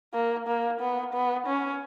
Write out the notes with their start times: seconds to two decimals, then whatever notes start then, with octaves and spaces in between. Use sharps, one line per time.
0.14 A#3
0.47 A#3
0.81 B3
1.13 B3
1.47 C#4